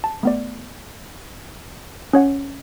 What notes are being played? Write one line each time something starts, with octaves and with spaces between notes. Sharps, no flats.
A5
A3 B3 D5
C#4 C#5 F#5